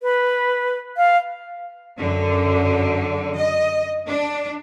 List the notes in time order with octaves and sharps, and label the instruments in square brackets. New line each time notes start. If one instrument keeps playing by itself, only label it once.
[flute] B4
F5
[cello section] F#2 D3
D#5
D4